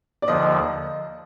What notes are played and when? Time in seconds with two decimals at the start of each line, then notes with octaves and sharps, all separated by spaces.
0.22 D5
0.27 D#2 D3 F3 D#5